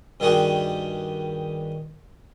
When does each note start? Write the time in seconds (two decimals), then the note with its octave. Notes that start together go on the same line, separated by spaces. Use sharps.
0.20 G2 D#3 G3 F#4 G#4